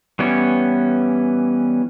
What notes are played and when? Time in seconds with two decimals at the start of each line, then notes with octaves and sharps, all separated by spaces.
0.19 E3 G3 B3 C#4 C#5